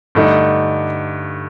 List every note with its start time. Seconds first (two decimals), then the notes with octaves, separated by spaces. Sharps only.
0.15 G2 D3 A3 D#4